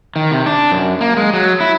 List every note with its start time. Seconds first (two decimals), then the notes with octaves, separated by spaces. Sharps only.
0.16 D#3
0.31 C3
0.46 D4
0.72 F#2
1.01 A#3
1.17 G#3
1.33 F#3
1.60 E4